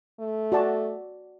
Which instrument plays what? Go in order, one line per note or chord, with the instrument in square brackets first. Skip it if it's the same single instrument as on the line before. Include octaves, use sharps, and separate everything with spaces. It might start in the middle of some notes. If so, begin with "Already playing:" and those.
[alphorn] A3
[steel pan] F#4 D5 A5